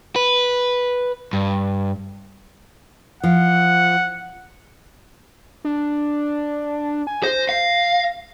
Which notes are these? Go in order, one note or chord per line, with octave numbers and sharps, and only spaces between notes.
B4
G2
F3 F#5
D4
G#5
C5 A#6
F5